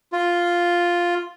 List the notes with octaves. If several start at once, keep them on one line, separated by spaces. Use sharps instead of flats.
F4